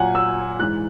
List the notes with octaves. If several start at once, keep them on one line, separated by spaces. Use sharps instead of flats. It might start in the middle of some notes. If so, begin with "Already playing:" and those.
Already playing: A#2 F#3 F#5 G#5
E6
G#2 E3 F#6